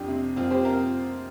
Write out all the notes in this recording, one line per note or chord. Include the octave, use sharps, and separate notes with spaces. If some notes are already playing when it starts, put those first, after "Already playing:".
Already playing: F2 D4 G4
C3
F2 C4 F4
G4 C5
C3 F4 A#4